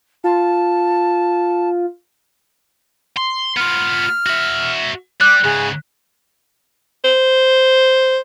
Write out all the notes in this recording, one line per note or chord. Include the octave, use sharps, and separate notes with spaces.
F4 A5
C6
B3 F4 F6
F#4 E5
G3 D6 F#6
G#2 C#3 G#4
C5